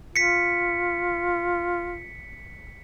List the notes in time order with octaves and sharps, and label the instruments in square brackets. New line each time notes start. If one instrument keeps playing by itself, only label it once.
[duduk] F4 [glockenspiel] B6 C#7